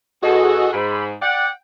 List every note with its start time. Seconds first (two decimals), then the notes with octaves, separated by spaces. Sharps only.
0.22 E2 F#4 G#4 A4 D#5
0.73 G#2 B5
1.21 D5 F#5 G5